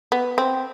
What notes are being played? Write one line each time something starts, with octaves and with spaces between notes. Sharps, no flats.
B3
C4